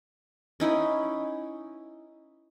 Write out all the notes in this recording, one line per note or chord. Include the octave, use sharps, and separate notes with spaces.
C#4 D#4 E4 B4